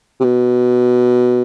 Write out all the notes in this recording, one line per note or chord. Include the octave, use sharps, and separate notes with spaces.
C3
B2